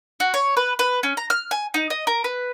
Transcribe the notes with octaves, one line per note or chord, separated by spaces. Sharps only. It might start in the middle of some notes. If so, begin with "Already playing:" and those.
F#4
C#5
B4
B4
C#4
A#5
F6
G#5
D#4
D#5
A#4
B4